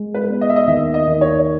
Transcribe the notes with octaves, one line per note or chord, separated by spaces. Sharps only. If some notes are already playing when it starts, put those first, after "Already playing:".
Already playing: G#3
B4
B3
D#5
E5
D#5
D#2 E5
D#5
D#2
C#5